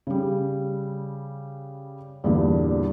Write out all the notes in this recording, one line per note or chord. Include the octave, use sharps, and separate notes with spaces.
C#3 G3
E2 G2 A#2 D3